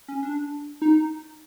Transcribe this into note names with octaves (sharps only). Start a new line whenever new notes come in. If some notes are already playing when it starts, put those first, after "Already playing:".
C#4
D4
D#4